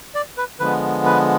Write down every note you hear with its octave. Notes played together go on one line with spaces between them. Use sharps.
D5
B4
D3 F3 G#3 B3 B4
B4